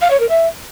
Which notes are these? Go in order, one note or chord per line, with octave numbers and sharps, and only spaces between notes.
F5
C#5
A#4
E5